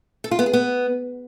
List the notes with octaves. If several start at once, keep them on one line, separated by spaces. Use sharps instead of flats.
A4
F4
B3
G#4
B3